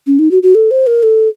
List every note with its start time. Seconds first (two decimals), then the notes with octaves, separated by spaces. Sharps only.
0.07 C#4
0.19 D#4
0.31 F#4
0.43 F#4
0.55 A4
0.71 C5
0.87 A#4
1.03 A4